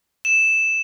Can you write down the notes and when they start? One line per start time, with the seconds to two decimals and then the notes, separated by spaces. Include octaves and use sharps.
0.25 E7